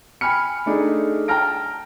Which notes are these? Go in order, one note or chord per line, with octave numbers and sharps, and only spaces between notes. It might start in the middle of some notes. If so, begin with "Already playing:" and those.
G5 G#5 B5 F6 C#7
A3 D4 D#4 G#4 A4
G5 A5 A#5 F6 A#6 D7